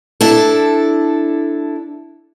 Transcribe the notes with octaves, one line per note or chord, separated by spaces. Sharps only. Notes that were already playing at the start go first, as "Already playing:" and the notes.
D4 E4 A4